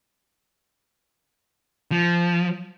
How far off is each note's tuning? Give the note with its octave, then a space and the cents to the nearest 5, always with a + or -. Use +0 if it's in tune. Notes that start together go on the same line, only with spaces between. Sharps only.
F3 -15